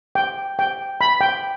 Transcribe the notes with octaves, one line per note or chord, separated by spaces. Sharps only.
G5
G5
B5
G5